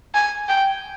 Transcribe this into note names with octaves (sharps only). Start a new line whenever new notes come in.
G#5
G5